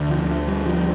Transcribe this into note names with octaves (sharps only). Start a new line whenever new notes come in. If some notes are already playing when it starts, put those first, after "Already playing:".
Already playing: D2 D3
F3
G3
F3